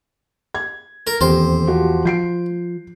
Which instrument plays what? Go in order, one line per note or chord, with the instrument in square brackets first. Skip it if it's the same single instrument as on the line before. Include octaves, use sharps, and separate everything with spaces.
[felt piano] G#6
[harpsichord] A#4
[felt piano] D#1 C4 G4 [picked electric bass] E2 [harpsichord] C5
[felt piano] F3 F#4 G4
[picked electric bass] F3 [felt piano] G6 C7 D7